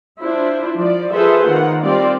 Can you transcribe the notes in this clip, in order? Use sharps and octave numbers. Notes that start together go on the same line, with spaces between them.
D4 E4 F4 C5
F3 D5
F4 G#4 A4 B4 C5 E5
D#3 A#3 F4 F#5
G3 C4 F4 D5